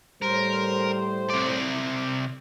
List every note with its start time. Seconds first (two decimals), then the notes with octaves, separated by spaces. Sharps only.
0.22 A2 G3 A#4 C5
1.30 C3 D5